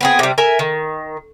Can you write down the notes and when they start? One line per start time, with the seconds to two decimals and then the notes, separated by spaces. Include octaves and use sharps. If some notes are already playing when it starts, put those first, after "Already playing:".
0.01 B3 C4 G#4
0.19 C3 G3
0.38 A#4 E5 G#5
0.59 D#3